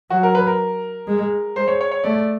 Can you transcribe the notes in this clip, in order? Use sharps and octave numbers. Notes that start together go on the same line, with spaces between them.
F#3 F#4
A#4
B4
A#4
G#3
G#3 C5
C#5
C#5
C#5
A3 D5